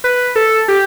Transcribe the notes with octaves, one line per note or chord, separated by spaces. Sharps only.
B4
A4
G4